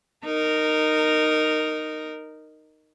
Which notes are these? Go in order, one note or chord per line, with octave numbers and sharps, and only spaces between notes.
D#4 A#4